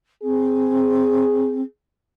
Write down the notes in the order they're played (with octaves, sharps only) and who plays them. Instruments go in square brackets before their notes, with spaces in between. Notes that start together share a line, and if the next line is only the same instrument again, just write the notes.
[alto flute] C4 [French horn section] G#4